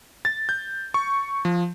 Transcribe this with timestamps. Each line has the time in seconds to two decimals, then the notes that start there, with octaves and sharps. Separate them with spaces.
0.25 A6
0.49 G6
0.94 C#6
1.45 F3